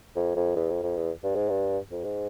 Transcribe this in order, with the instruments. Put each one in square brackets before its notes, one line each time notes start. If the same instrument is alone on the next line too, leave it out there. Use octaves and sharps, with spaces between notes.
[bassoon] F2
F2
E2
F2
F2
E2
G2
G#2
G2
F2
G#2